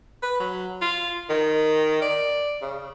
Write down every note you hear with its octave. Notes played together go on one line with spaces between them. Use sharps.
B4
F#3
F4
D#3
D5
C#3